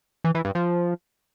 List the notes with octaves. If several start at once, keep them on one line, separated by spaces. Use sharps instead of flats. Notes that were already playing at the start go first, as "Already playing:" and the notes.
E3
E3
G2
F3